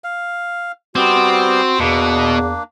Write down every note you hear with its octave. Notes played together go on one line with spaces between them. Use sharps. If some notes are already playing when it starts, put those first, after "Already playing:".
F5
G3 B3 C4 F#4 D6
E2 B2 A#3 D4